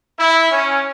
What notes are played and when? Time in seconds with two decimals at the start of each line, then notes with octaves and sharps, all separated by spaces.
0.18 E4
0.50 C#4